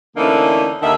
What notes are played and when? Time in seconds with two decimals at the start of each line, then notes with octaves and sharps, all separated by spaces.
0.17 D3 E3 A3 A#3 C#4 D#4
0.82 D#2 D3 D#3 E5